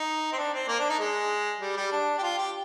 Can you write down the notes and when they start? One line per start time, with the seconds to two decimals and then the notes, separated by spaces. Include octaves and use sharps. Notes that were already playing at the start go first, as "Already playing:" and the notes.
Already playing: D#4
0.32 C4
0.38 D4
0.53 C4
0.68 A#3
0.79 D4
0.89 D#4
1.00 G#3
1.61 G3
1.77 G3
1.92 D4
2.18 G4
2.23 F4
2.38 G4